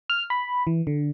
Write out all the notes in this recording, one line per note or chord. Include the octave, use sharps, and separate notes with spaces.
F6
B5
E3
D3